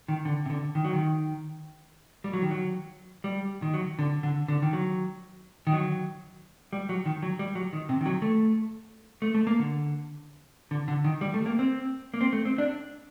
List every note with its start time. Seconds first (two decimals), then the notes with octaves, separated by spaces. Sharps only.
0.08 D#3
0.25 D3
0.46 C3
0.50 D3
0.75 D#3
0.85 F#3
0.93 D#3
2.24 G3
2.33 F#3
2.42 D#3
2.51 F#3
3.24 G3
3.62 D#3
3.74 F#3
3.99 D3
4.23 D3
4.48 D3
4.62 D#3
4.73 F#3
5.67 D#3
5.73 F#3
6.73 G3
6.89 F#3
7.06 D#3
7.22 F#3
7.39 G3
7.55 F#3
7.73 D#3
7.89 C3
8.01 D#3
8.06 F#3
8.22 A3
9.22 A3
9.35 A3
9.47 A#3
9.59 D3
10.71 D3
10.88 D3
11.04 D#3
11.21 G3
11.34 A3
11.46 A#3
11.59 C4
12.14 A#3
12.21 C4
12.33 A3
12.45 C4
12.58 D4